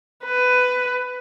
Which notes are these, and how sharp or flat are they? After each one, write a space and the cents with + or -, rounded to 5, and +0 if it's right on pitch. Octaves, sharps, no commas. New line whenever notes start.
B4 +15